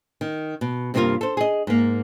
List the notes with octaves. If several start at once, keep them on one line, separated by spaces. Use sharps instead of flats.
D#3
B2
G2 C3 A#3 D4 F4 A#4
A4 C5
G#4 D#5
G#2 A#3